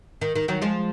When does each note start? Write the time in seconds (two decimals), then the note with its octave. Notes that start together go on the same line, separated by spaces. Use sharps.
0.21 D#3
0.35 D#3
0.48 D#3 F#3
0.62 F3 G#3